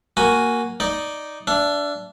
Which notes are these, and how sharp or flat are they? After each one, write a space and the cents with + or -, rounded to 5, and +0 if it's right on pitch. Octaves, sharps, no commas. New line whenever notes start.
A#3 +0 F#4 +0 G#5 +0
D#4 +0 D5 +0
D4 -15 E5 +30